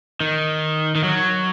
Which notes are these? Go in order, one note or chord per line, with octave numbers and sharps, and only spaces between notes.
D#3
D#3
F#3